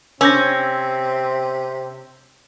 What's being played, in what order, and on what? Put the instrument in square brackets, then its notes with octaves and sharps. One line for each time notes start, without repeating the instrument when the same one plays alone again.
[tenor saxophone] C3 [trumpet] C4 [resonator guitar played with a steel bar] C#4 [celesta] E6 G6 A#6